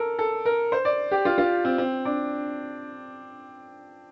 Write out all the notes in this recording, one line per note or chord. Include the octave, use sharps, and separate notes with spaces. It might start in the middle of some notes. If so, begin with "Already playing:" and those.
Already playing: A4 A#4
A4
A#4
C5
D5
G4
F4
F4
C4
C4
D4